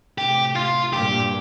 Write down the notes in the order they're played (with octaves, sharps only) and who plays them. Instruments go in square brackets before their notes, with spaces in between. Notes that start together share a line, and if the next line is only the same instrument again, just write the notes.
[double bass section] A2 C3 [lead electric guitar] G4
[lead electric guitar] F4
[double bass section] G2 A#2 [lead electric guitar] G4